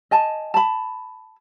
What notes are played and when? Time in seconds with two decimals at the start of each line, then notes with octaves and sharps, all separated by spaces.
0.11 D#5 G#5 A5
0.54 A5 B5